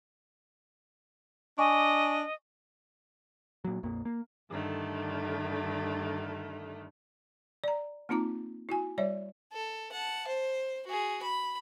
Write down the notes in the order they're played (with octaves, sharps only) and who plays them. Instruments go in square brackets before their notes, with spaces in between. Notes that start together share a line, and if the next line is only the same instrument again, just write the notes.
[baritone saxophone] D4 [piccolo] D#5 [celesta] G#5 C#6 D6
[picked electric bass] A#2 F#3
A#1 F2 A#3
A#3
[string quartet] G2 D3 D#3 A3
[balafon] D5 A#5
A#3 C4 D#4 F4 A#5 D6
E4 F#4 G#5
G3 C#5 D5 E5
[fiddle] A4
F#5 A5
C5
F#4 G#4
B5